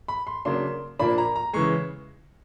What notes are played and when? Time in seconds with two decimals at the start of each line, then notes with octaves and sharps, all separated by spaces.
0.08 B5
0.27 C6
0.45 C#3 F#3 A#3 D4 C6
0.99 A#2 F3 A#3 D4 B5
1.18 A#5
1.36 A#5
1.53 C#3 E3 G#3 C#6